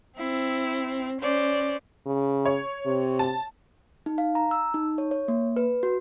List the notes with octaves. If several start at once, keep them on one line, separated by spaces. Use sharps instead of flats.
C4 E4
C#4 C5 D5
C#3
C#5
C3
A5
D#4
F5
A#5
E6
D#4
C#5
C#5
A#3
B4
F#4